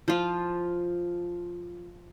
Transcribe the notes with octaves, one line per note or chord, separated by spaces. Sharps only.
F3 F4